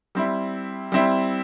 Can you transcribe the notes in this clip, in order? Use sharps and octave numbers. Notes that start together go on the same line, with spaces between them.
G3 C4 E4
G3 C4 E4